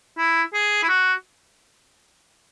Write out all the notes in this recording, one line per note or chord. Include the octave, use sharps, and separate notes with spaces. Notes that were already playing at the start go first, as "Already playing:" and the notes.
E4
G#4
E4
F#4